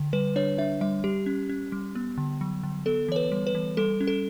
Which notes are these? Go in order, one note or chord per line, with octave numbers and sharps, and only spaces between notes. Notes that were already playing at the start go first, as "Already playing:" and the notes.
Already playing: D3
G3 B4
D4 C#5
D4 E5
G3 E5
G3 G4
C#4
C#4
G3
B3
D3
F#3
D3
B3 A4
E3 C#5
B4
G3
B4
E3
G3 A4
C#4
A4